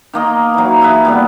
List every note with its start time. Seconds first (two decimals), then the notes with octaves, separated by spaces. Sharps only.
0.13 D#3 A#3 D#5
0.54 E3 F#3
0.81 E4 G#4 B4
1.05 A#2 G3 B3